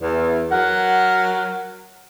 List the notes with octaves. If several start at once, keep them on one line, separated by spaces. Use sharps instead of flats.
E2
F#3 A#4 F#5